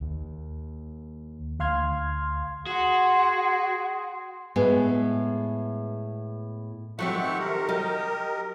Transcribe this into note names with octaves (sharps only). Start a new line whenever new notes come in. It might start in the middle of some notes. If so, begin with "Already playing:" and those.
D#2
D2 F5 C6 F6 G#6
F#4 G#4 F#5 C6
A2 G#3 B3 G#4
F3 F#3 A3 C4 G4 E5 F#5 C#6
D#3
A#4
F#3 D#4 G4